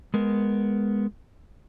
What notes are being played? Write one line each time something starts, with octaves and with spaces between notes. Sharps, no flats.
G#3 B3 A#4